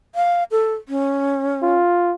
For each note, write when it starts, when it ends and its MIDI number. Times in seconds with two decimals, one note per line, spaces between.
0.15 0.44 77
0.51 0.74 69
0.89 1.77 61
1.62 2.14 65